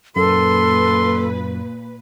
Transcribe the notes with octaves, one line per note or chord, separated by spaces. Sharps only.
F#2 A#2 A4 B4 C6